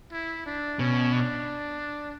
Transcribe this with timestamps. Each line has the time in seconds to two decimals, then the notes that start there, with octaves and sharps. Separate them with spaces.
0.12 E4
0.46 D4
0.79 B2 C#4
1.12 D4